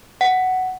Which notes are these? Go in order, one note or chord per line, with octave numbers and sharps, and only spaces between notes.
F#5